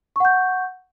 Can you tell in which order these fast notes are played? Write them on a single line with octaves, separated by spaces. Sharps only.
C#6 F#5 G6